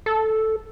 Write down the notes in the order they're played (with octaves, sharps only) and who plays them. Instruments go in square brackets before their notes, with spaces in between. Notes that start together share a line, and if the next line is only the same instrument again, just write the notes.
[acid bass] A4